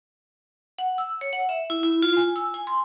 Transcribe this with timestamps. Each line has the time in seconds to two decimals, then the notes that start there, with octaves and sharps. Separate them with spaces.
0.78 F#5
0.98 E6
1.21 C#5
1.33 F#5
1.49 E5
1.70 E4
1.83 E4
2.02 F4
2.17 G#5
2.36 E6
2.54 G#5
2.67 C6